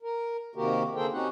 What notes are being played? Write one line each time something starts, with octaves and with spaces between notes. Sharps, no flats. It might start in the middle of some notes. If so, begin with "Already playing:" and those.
A#4
C3 D#3 A#3 F#4 G4 A#4
D3 A#3 G#4 A4 C5 G5
C4 C#4 D#4 F#4 G4 F#5